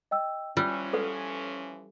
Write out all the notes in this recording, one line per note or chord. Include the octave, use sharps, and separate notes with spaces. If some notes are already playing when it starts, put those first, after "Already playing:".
D#5 G5 E6
E3 F3 G3 C#4 F4 E6 F#6
A4 B4 F#5